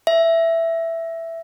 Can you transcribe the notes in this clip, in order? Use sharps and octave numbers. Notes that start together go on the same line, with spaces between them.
E5